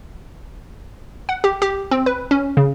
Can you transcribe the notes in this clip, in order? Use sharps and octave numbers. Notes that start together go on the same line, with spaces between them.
F#5
G4
G4
C4
B4
C#4
C#3